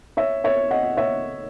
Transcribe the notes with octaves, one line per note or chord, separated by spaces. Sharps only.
C#5 E5
C#5 E5
D#5 F#5
C#5 E5